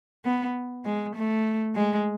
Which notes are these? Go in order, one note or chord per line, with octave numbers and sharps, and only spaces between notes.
B3
G#3
A3
G#3